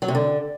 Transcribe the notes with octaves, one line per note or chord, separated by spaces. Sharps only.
F#3
C3
D3